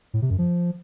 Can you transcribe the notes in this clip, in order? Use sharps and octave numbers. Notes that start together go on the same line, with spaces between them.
A2
C3
F#2
F3